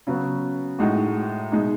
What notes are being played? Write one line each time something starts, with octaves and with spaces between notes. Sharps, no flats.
C#3 F#3 B3
A2 G#3 D#4 F#4
B2 G#3 D#4